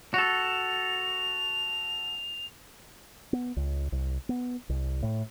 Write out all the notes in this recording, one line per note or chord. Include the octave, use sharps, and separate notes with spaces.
F#4 A4 F7
B3
C#2
C2
B3
C2
A2